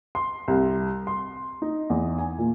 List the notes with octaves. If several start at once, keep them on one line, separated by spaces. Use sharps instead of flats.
C6
C2
C6
D#4
E2
G#5
A#2